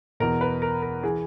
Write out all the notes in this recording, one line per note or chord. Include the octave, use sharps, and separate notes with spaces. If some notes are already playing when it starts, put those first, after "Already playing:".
E2 B2 A#4
B4
A#4
A#4
E3 G#4